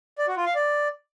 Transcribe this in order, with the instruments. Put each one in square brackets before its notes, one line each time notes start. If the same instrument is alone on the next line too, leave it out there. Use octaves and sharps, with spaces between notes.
[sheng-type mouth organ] D5
F#4
F4
F5
D5